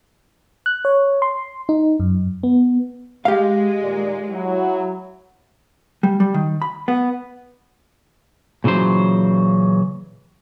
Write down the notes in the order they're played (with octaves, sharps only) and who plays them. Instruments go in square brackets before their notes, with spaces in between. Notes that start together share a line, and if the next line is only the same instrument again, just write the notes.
[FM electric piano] F#6
C#5
C6
D#4
F#2
B3
[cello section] G#3 [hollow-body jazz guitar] G4 F5
[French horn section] A#2 D#3 D5
F#3 E4
[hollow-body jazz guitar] G3
G3
D#3
B5
B3
[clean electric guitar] A#2 C#3 E3 F#3 C5